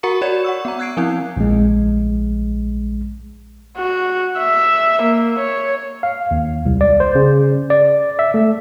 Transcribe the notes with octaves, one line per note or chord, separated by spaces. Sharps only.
F#4 A#4 F#5 A#5 C#6 C#7
F#4 C#5 D5 F#5 G#6 E7
F#5 C#6 E6
B3 A#5
E6 F#6 G#6 C7 D7
F3 C4 E4
A#1 G#3
F#4
E5
A#3
C#5
F5
D#2
C2
D5
C5
C#3
D5
E5
A3